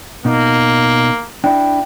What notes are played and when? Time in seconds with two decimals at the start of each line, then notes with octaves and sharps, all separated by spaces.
0.25 B2 A#3 D#4
1.44 D4 E4 G5